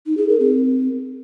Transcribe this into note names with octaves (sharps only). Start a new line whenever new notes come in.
D#4
G#4
A#4
C4